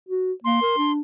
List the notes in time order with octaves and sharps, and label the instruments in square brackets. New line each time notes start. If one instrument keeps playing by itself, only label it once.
[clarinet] F#4
[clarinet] A#3 [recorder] C6
[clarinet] A#4
D4